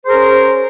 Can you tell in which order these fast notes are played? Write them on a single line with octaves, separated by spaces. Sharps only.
C5 G#4 A#4 C#4